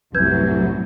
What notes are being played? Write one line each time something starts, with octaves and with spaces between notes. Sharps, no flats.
C2 F#2 A2 E3 F#3 B4 G6 G#6